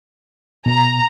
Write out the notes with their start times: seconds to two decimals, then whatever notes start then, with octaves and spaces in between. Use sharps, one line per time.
0.66 B2 A#5